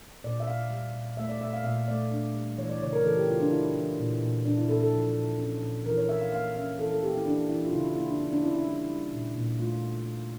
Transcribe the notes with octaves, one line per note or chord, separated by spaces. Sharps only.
A#2 D5
E5
A#2 F5
G3
A#2
A3 E5
D5
A#2 E5
F5
A#2 E5
A3 D5
D4
G3
E3 C#5
D5
C#3 C#5
A#4
E3 A4
G4
C#3 F4
D4
E3 E4
E3
A#2
A#2
A#2 D4
E4
A#2 A4
A4
F3
A#2
C#4
A#2
E3 A#4
C#5
E3 E5
F5
A#3 F5
C#4 E5
E3 A4
A4
A#3 G4
E4
E3 D4
E3 E4
F4
C#3 E4
F4
A#3 E4
D4
C#4
D4
C#4 E4
E4
G3
G3
A#2
A#2
A3 F4